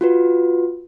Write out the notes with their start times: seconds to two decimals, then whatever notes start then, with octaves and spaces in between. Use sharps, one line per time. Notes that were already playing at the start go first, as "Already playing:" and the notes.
0.01 F4 F#4 B4